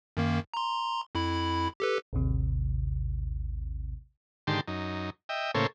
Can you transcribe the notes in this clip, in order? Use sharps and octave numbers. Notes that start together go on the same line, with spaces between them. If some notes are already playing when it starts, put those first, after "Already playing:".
F#2 D#3 A#3
A#5 C6
F2 E4 B5
G4 A4 B4
A1 D#2 C3
G#2 D3 D#3 G4 A5 C6
F#2 D#4
D#5 E5 G5
A2 C#3 A#3 A4 C5 C#5